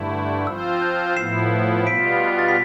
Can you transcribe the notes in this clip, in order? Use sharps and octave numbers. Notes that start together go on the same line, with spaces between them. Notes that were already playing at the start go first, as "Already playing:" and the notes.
Already playing: G2 D3 A3 E4
F3 C4 F4 C5 E6
G6
A2 F3 B3 E4 C7 E7
B2 G3 B3 F4 B6 D7
A6
B6